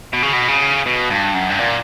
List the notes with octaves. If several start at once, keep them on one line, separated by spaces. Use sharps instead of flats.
B2
C#3
B2
C#3
B2
G2
F#2
G2
A#2